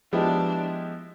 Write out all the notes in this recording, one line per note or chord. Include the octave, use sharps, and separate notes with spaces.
F3 G#3 B3 D4 E4 G4